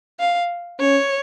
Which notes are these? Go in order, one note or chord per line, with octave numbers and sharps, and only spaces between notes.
F5
C#4 C#5